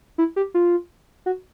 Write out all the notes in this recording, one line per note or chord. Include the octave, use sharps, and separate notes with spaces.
E4
G4
F4
F#4